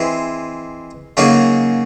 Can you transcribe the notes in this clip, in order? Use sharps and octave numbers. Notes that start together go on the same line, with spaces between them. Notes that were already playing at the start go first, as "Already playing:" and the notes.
Already playing: E3 G#3 C4
C#3 F#3 A#3 D#4 G#4